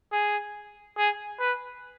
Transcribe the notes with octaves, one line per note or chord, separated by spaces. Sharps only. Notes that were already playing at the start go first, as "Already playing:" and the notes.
G#4
G#4
B4